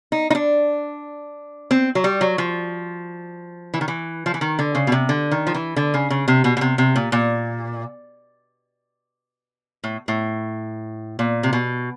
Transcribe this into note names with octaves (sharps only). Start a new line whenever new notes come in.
D#4
D#4
D4
C4
F#3
G3
F#3
F3
E3
D#3
E3
F3
E3
D#3
D3
C#3
B2
C3
D3
D#3
F3
E3
D3
C#3
C#3
C3
B2
B2
C3
C3
A#2
A#2
A2
A2
A#2
C3
B2